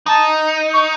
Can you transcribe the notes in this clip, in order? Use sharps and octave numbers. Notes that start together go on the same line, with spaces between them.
D#4 A5
C#6